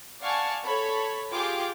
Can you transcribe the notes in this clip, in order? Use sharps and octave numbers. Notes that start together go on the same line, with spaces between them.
D5 F5 F#5 G#5 A5 C#6
A4 C#5 B5
F4 G4 G#4 G5 D6